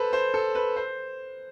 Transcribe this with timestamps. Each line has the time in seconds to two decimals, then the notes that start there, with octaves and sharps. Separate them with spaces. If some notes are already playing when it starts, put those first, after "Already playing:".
Already playing: A4 B4 C5
0.13 C5
0.34 A4
0.55 B4
0.76 C5